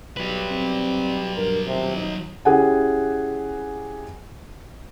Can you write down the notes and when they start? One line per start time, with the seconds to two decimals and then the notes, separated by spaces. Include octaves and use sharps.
0.17 B1 F#3 G3 B4
0.50 C4
1.36 G2 A#4
1.67 D#1 C3
1.96 D#4
2.45 C#4 E4 G4 G#4 F#5 G#5